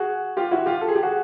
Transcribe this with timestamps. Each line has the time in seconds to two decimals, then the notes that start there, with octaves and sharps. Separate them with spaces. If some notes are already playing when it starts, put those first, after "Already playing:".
Already playing: F#4 G#4
0.37 F4 G4
0.51 E4 F#4
0.66 F4 G4
0.81 A4
0.88 G#4
0.95 G4
1.03 F#4 G#4